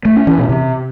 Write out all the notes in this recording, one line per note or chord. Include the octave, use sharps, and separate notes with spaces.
A3
C#4
E3
B2
C3